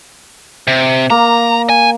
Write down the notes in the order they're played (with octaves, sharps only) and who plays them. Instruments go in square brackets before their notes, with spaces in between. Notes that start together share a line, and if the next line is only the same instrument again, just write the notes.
[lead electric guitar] C3
[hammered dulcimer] A#3 [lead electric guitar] A#5
[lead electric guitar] G#5